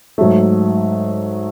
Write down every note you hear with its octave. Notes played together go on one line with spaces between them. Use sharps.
G#2 F#3 A3